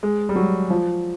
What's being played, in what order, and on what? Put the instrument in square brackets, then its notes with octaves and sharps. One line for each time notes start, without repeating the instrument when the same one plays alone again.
[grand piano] G#3
G3
F#3
F3